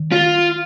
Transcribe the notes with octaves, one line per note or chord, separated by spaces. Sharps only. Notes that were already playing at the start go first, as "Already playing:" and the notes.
Already playing: D#3
F4